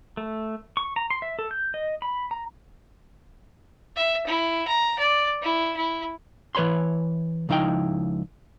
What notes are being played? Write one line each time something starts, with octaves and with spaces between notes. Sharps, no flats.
A3
C#6
A#5
C6
E5
A4
G6
D#5
B5
A#5
E5
E4
A#5
D5
E4
E4
E3 B4 C#5 B5 C6
C#2 F3 D#4 E4 G5